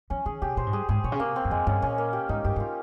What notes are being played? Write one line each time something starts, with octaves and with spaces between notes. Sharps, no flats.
F3 C#4
D#3 G#4
C3 G4
A#2 C5
G#2
G2 G#4
G#2 G#4
A#2 C#5
C#3
C3 A#3
C4
G2
F2 G#3
G2 C#4
A#2 C#4
A#3
G4
G#2 D#4
G2 G4
G2
F4